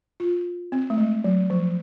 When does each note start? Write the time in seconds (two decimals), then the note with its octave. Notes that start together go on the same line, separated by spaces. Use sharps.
0.20 F4
0.72 C4
0.90 A3
0.98 G#3
1.24 F#3
1.50 F3